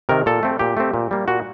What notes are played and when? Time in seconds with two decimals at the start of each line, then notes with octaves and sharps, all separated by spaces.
0.09 C3 D#3 A#4
0.26 A#2 A4
0.43 A3 C4
0.59 A#2 G4
0.77 A3 C4
0.94 A#2
1.11 G3 A#3
1.28 A#2 F#4